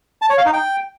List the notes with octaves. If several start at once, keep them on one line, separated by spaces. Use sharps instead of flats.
A5
C#5
F5
D#4
G5